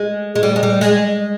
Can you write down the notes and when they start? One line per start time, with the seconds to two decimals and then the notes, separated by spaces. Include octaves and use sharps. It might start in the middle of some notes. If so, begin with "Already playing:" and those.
Already playing: G#3
0.36 G#3
0.43 G3
0.56 G#3
0.63 G3
0.81 G#3